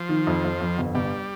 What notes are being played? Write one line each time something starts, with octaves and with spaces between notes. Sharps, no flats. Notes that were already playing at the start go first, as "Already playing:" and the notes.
Already playing: F3
D#3
F2
F2
F2
G1
G1 G3